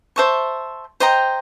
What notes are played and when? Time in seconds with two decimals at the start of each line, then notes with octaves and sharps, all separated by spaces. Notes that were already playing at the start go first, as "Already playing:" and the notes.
0.16 C5 E5 A5 C#6
1.00 C5 D#5 G5 A#5